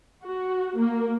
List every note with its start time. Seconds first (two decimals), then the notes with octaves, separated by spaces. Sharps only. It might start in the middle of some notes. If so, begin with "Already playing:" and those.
0.25 F#4
0.79 A#3